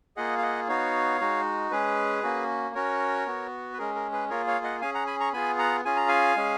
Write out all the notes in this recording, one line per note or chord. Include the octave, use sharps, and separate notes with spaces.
A#3 F4 G#4 D#5 F#5
F5
D#5 F#5
B3 D#4 F#4 C#5 F5
G#3 D#4 F#4
G#3 C#4 G#4 B4
A#3 C#4 F#4
C#4 F#4 A#4 C#5
B3 F#4
B4
G#3 C#4 G#4 A#4
A#4
G#4 B4
A#3 F4 G#4 A#4 C#5
C#5 F5
D#5 F#5
C#4 G#4 F5 G#5
F#5 A#5
G#5 B5
A#5 C#6
B3 F4 G#4 G#5 B5
F#5 A#5
C#4 F4 G#4 G#5
A#5
F5 G#5
G#3 C#4 G#4